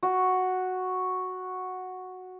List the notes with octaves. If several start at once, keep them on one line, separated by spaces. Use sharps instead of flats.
F#4